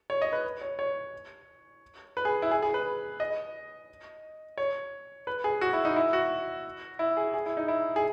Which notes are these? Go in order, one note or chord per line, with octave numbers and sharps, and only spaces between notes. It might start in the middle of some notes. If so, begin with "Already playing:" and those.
C#5
D#5
B4
C#5
C#5
B4
G#4
E4
G#4
G#4
B4
D#5
C#5
B4
G#4
F#4
E4
D#4
E4
F#4
E4
G#4
G#4
E4
D#4
E4
G#4